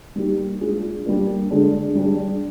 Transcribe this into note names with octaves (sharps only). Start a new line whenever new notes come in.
G3 A#3 D#4 G4
G#3 D4 F4 G#4
G3 A#3 D4
D3 G#3 D4
G3 D4 G#4